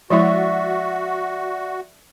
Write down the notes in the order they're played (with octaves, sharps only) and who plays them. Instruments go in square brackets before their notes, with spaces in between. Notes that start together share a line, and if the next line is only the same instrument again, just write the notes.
[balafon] F3 G#3 E4 [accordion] F#4 [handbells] D5 E5 C#6